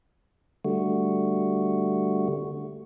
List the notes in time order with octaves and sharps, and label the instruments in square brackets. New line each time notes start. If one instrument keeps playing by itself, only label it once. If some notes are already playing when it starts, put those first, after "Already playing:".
[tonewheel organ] D3 G3 A3 F#4